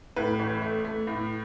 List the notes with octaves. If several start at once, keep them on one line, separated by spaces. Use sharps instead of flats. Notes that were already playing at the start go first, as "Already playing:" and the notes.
A2 B4
A1
A3
A3
A2